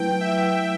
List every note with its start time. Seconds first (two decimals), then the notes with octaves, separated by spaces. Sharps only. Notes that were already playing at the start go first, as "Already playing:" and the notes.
Already playing: F#3 A3 E4 B4 G5
0.21 E5